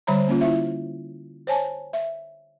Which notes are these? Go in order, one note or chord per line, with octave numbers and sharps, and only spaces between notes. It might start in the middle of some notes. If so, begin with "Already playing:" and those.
D3 G3 C5 C#5 A#5 B5
A#3 C#4 F4
E4 E5
C5 C#5 G#5 A5
E5